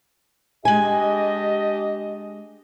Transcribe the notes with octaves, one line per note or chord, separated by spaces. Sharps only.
G#3 D4 G4 D#5 G#5